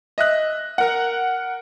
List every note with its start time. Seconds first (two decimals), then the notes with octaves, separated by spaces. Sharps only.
0.18 D#5 E5 F#6
0.78 A#4 F#5